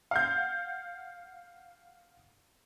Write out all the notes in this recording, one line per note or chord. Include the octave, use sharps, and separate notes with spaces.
F5 F#5 G6